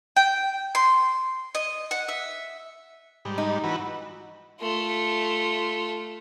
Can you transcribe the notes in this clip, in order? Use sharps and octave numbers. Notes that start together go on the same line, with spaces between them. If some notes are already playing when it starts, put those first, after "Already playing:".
G5
C6
D#5
F#5
E5
G#2 G3
D#4
E3 F#4 B4
A3 F4